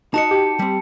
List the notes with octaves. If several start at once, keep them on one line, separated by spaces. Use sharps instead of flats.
D#4 F#4 D#5 A5 C#7
G4
G3 C4